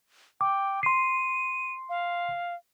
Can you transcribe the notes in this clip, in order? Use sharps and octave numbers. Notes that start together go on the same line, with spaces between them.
G5 D6
C6 C7 D#7
F5